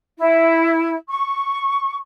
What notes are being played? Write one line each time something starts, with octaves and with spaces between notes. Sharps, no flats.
E4
C#6